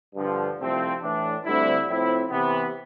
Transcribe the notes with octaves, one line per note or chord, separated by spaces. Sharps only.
G2 D3 F3
C2 C3 F3 A3 C4
A2 E3 A3 D4
D2 D3 G3 C4 E4
A2 F3 C4 E4
C3 E3 B3